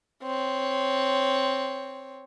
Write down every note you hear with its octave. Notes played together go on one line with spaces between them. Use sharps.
C4 C#5